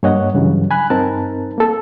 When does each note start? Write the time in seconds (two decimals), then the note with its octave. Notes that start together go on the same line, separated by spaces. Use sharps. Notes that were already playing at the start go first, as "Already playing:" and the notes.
0.03 G2 A#3 C#5 D#5 F#5
0.35 G2 C#3 E3 F#3
0.71 G#5 B5 F#6
0.90 G2 C4 D#4 A#4 A5
1.58 A#3 A4